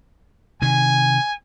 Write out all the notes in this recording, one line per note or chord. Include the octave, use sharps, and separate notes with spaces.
C3 D#3 G#5